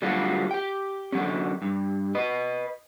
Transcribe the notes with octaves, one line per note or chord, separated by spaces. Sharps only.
D3 F#3 G3 A3 F4 F#4
G4 G5
D3 F#3 C#4
G2
B4 D#5